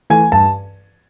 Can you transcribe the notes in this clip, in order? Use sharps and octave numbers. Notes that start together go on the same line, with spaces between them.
E3 A3 G#5
G2 A5